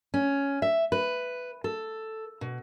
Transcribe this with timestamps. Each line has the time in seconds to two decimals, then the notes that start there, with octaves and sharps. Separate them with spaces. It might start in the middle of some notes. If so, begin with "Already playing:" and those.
0.14 C#4
0.62 E5
0.92 B4
1.64 A4
2.41 B2